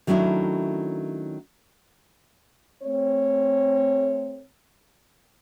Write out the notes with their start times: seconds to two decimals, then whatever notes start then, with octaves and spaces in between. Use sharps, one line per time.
0.07 D#3 F#3 A3 C#4 D4 E4
2.83 A3 C4 C#5